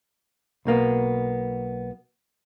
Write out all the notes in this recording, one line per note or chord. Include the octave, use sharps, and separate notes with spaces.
B1 B2 A#3 B3